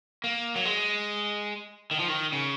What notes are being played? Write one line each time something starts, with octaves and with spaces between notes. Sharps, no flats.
A#3
F#3
G#3
D#3
F3
D#3
C#3